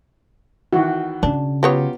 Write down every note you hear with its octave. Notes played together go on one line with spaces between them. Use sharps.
D#3 E3 F#4
C#3 D4
F#3 B3 F4 G4 C#5